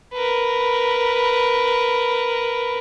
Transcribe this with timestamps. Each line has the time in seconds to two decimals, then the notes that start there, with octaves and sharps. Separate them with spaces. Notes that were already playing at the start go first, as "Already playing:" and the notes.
0.14 A#4 B4